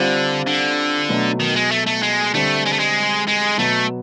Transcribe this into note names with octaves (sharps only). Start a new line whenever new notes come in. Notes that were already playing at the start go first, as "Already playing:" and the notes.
Already playing: D3 G3 C4 F4
D3
B2 F#3 A3
D#3
G#3
A3
A3
G#3
D3 G3 A3 C4
G#3
A3
G#3
G#3
B2 F#3 A3 B3